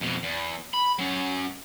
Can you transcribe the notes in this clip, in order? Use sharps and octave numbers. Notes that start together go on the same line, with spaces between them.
F2 B2
E2
B5
F#3 C#4